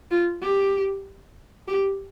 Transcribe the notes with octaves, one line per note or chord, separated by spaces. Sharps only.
F4
G4
G4